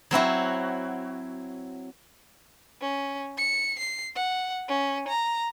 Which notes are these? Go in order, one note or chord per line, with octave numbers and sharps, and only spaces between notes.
F#3 C4 E4 F#4
C#4
C#7
C7
F#5
C#4
A#5